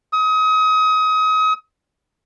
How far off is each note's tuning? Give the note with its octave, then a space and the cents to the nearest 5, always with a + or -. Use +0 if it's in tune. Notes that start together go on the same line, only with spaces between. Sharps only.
D#6 +30